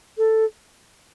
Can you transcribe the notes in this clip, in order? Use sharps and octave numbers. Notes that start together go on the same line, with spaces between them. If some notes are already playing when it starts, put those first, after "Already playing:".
A4